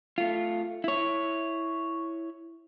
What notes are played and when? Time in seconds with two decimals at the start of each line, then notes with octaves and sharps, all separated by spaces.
0.18 A3 F4
0.84 E4 C#5